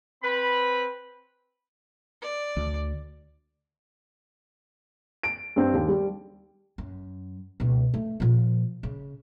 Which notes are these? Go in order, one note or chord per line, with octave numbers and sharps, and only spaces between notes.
C4 B4 B5
D5
D2
D7
G2 C4
D#2
G3
F#2
C#2 B2
A3
A#2 F3
C#3